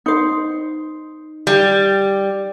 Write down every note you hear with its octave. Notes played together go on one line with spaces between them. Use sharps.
D#4 C5
G3